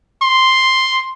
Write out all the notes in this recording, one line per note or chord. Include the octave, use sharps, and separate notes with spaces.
C6